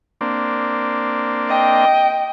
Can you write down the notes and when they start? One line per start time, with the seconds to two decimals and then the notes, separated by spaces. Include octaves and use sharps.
0.21 A#3 C4 D4
1.48 D#5 G5